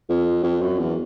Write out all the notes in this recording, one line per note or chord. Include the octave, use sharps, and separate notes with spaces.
F2
F2
F#2
E2